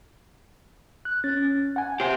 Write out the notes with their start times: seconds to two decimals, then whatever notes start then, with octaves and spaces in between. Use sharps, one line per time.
1.05 F#6
1.24 C#4 A6
1.76 F#5 G#5
2.00 G4 C5